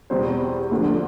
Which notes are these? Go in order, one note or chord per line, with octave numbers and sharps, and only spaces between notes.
E2 B2 G3 C4 C5
D2 D3 F3